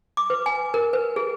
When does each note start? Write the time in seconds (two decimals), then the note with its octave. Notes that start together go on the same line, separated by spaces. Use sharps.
0.17 D6
0.30 B4
0.46 G#5
0.74 A#4
0.93 B4
1.16 G#4